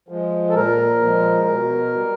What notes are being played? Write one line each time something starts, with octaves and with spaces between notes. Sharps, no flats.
F3 G#3
A4
A#2 A#4
F3 G#3
B2
G3